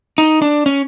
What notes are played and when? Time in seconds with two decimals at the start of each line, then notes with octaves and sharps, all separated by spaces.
0.18 D#4
0.42 D4
0.66 C#4